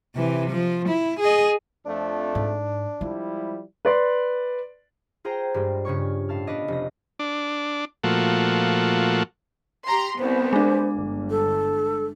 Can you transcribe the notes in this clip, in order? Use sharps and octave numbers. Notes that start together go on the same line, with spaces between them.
C3 E3
F3
E4
G#4 D#5
F2 A3 D4
G#2
F3 G3 G#3 E4
B4 D5 C6
F4 G#4 C5 G5 A#5
G2 G3 G#3
G2 C#3 C#5 C#6
A2 F5 A5 F6
B3 D4 B4 D5 D#5
F1 A#6
D4
A#2 F3 A3 F#4
G4 A#5 C6
C2 B3 C5
G#3 D4
G1
A4